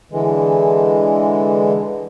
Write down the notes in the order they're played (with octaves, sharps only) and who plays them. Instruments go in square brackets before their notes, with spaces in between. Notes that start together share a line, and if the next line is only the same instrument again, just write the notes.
[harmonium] D3 E3 G#3